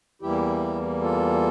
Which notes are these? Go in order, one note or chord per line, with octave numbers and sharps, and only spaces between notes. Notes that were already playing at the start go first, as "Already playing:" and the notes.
E2 E3 G3 A#3 E4 G4
F4 A4